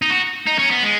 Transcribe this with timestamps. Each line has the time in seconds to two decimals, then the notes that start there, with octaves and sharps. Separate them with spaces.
0.02 D#4
0.10 F#4
0.46 D#4
0.58 C#4
0.71 B3
0.83 G#3